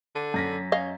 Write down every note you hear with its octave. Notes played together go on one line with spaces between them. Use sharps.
D3
F#2 A#6 B6
C#4 D#5 F5